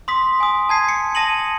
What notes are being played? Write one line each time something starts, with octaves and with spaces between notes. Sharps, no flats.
C6 D#6 B6
G#5 D#6
A5 G#6 C7
C#7
A5 D#6 A#6 D#7 F#7